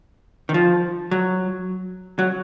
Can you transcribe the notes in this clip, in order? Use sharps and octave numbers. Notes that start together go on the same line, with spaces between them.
D#3
F3
F#3
F#3